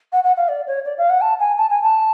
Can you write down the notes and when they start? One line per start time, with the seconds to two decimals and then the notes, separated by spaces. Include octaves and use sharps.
0.13 F#5
0.24 F#5
0.37 F5
0.49 D5
0.67 C#5
0.85 D5
0.98 F5
1.10 F#5
1.21 A5
1.40 G#5
1.58 A5
1.70 G#5
1.83 A5